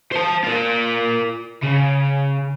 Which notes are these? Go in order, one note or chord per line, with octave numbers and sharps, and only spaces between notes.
C5 A5
F4 A#4
C#3